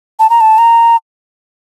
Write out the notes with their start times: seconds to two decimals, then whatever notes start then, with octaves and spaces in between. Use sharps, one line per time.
0.19 A5
0.30 A#5
0.41 A5
0.58 A#5